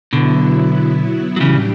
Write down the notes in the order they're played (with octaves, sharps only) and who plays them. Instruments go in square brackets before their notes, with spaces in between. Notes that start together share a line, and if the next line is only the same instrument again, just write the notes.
[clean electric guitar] B2 D3 [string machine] F#3 B3 E4
[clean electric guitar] F#3
[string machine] A2 G3 D4 G4 [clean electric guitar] C#3 E3